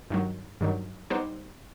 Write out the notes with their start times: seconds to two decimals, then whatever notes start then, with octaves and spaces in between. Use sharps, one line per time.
0.10 G2 D#3 F#3
0.61 G2 D#3 F#3
1.10 G3 B3 D#4 G4 C5